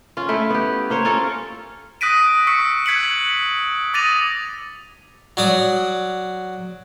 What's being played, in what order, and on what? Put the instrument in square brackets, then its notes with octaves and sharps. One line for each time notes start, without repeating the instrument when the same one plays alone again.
[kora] C#4 F4
A3 E4
B3 G4
A#3 C5 C#5
C#4 F4 A4 A#4
[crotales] D#6 F#6 A#6 B6 D7 D#7
C#6 E6 B6 C#7
F#6 G#6 B6 C#7 F#7
D6 D#6 A6 A#6 D#7 F7
[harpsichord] F#3 D5 D#6